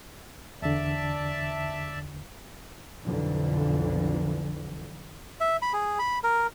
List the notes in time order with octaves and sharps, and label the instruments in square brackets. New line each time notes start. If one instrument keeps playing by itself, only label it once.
[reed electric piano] E2 D3 [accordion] D5 E5 A5
[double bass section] B1 F2 D3 E3
[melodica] E5
B5
G#4
B5
A#4